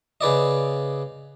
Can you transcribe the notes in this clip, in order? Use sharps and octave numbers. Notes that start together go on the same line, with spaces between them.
C#3 B4 D5 D#5